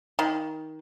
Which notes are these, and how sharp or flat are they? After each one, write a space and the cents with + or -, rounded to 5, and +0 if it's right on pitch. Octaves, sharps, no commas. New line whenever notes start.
D#3 +15